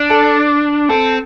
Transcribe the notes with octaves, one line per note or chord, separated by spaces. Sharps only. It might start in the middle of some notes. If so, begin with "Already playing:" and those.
Already playing: D4
A4
C4 A4